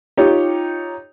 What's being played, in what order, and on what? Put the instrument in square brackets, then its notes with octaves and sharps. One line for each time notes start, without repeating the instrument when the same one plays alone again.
[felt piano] D#4 F4 C#5 [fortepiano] G4